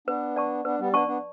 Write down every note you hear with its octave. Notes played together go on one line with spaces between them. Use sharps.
B3 D4 B4
D5 A5 C#6
B3 D4 B4
G3 B3
B3 D4 D5 A5 C#6
B3 D4